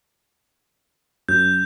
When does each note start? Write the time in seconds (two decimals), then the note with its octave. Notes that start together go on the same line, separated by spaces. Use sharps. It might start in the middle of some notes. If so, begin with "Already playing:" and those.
1.28 F#2 G6